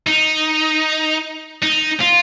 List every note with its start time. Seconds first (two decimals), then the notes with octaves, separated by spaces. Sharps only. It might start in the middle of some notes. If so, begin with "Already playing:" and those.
0.07 D#4
1.63 D#4
2.01 F4